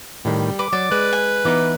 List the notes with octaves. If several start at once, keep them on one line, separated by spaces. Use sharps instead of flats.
A2 D#3 G3
B4 D6
F#3 D5
G#3 B4
G#5
E3 B3 D#4 D6